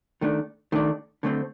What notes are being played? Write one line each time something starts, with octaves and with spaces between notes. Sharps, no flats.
D#3 A3 D4
D#3 A3 D4
D3 A3 C4